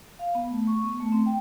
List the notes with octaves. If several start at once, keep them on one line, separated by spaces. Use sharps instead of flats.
F5
B3
A3
C#6
B3
A3
C4
G5